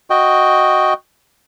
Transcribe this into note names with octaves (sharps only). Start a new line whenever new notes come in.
F#4 D#5 G5